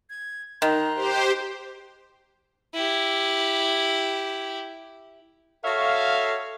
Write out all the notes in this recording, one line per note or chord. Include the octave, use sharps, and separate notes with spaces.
G#6
D#3 A#5 C6 F#6
G4 C5
E4 G4
F#4 A4 C#5 E5 F5